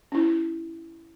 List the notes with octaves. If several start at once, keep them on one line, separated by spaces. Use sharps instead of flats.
C#4 E4